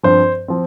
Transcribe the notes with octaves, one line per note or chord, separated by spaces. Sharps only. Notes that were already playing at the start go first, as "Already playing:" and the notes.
G2 F3 C4 C5
F3 C4